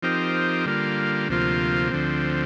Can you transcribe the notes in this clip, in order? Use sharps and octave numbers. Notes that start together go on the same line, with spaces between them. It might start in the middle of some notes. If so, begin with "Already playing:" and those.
F3 C4 D#4 G4 A#4
D3 G3 A#3 F4
D2 C3 F3 A#3 F4
D2 D3 F3 C4